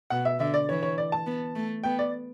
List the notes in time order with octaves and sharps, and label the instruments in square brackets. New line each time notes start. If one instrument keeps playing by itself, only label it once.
[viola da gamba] B2 [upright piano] F#5
[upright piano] E5
[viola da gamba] D3 [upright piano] E5
[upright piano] D5
[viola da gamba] E3 [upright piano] C#5
[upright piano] C#5
D5
A5
[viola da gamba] B3
A3
[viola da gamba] B3 [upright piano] G5
[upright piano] D5